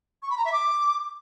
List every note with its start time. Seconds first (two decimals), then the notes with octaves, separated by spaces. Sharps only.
0.23 C#6
0.30 B5
0.38 A#5
0.45 E5
0.52 D6